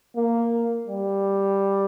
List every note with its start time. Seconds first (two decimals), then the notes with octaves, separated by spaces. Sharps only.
0.16 A#3
0.86 G3